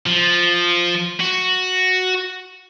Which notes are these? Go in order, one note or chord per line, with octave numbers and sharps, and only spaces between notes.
F3
F#4